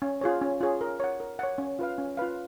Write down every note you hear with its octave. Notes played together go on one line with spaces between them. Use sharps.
C#4
F4 G#4 C#5
C#4
F4 G#4 C#5
A#4
C#5 F#5
A#4
C#5 F#5
C#4
F4 B4 F5
C#4
F4 B4 F5